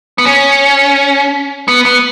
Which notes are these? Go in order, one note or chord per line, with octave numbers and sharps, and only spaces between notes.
B3
C#4
B3
B3